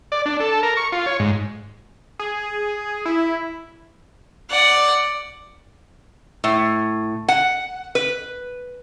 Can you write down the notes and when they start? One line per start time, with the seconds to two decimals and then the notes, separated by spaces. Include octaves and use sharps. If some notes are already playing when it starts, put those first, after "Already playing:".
0.12 D5
0.26 D4
0.40 A4
0.63 A#4
0.77 C#6
0.92 F4
1.06 C#5
1.19 G#2
2.19 G#4
3.05 E4
4.50 D5 F#5
6.44 A2
7.28 F#5
7.95 B4